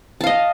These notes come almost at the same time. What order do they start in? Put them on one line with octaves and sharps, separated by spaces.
A5 F5 D#5